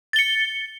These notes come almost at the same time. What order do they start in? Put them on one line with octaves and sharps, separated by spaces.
A6 G7 C#7